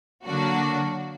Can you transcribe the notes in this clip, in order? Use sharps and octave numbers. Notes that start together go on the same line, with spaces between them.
D3 F#3 A#3 D4 F#4